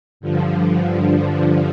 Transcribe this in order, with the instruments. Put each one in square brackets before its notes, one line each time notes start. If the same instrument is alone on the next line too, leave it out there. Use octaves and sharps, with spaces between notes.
[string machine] G2 D3 F3